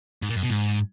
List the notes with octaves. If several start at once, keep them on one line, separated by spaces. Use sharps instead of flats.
G#2
A#2
F#2
B2
G#2